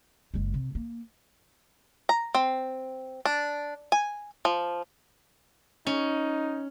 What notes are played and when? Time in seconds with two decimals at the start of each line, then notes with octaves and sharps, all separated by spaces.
0.34 F#1 G#3
0.54 C3
0.75 A#3
2.09 A#5
2.35 C4
3.25 D4
3.92 G#5
4.45 F3
5.87 C#4 D#4